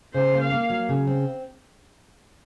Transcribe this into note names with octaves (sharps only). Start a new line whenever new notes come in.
C#3 C5
A#3
F5
A#3
F#3
C#3
C4